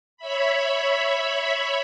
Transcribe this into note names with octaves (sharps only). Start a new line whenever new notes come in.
C#5 E5 B5